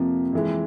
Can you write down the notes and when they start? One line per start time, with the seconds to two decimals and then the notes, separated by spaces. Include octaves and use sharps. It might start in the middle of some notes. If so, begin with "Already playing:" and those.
Already playing: F2 C3 F3 A#3
0.33 F2 E3 G#3